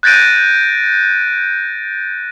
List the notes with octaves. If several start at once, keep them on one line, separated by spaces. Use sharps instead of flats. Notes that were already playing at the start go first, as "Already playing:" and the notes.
F#6 G6 A6 A#6 D7 D#7